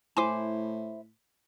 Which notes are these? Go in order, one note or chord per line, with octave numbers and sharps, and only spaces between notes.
A2 E4 C5 G#5 C6 D6